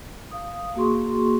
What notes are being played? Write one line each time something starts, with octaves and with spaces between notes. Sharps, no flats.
F5 D#6
A#3 F#4 G#4 C6 C#6